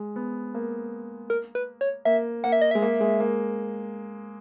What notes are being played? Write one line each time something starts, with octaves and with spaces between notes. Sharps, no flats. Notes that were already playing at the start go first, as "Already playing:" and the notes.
Already playing: G#3
B3
A#3
A#4
B4
C#5
A#3 E5
A#3 F#5
E5
D#5
G#3 E5
A#3
G#3
A#3